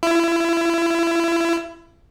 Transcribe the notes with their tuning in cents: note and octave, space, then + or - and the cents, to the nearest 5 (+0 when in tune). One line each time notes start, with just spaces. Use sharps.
E4 +30